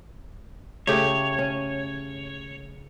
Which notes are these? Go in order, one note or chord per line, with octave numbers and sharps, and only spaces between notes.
C#3 A3 G4 C#5
C#4